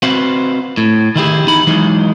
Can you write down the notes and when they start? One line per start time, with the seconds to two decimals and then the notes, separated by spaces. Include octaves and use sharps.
0.03 C4 F#4 B4 C5 F5 F#5
0.77 A2
1.16 D#3 E4 G4 G#4
1.46 E2 D#4 B5
1.67 E3 F#3 G#3 D#4